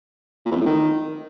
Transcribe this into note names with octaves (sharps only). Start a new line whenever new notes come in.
A#2
E2
F2
A2
D#3